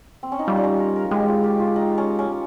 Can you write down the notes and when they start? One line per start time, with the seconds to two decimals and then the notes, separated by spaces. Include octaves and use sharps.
0.23 C4
0.32 C#4
0.39 D#4
0.47 G3 F4
0.57 D#4
0.63 C#4
0.79 A#4
0.96 A#4
1.11 G#3 G4
1.28 F4
1.44 G4
1.60 F4
1.76 D#4
1.98 C#4
2.19 C#4